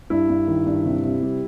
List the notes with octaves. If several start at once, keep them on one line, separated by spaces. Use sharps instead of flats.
G2 E4
G2
D#3
G2
C3
C3
G3